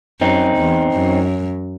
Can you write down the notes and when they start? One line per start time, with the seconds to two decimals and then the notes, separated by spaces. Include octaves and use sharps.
0.21 F#2 C4 D#4
0.57 E2
0.93 F#2